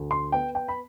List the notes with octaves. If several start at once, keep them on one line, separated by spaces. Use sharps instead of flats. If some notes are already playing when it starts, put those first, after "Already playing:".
Already playing: D2
C6
B3 G5
G5
B5